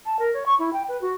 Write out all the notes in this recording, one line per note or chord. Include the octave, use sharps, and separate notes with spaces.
A5
A#4
C#5
C#6
E4
G5
B4
F#4